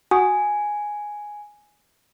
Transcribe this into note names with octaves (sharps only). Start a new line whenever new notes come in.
F#4 F#5 G#5 D#6